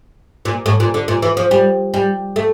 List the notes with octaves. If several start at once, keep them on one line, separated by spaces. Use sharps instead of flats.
A#2
A2
A#2
D3
A#2
E3
F3
G3
G3
A3